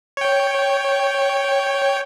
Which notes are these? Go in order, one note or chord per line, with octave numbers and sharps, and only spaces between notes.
C#5 G5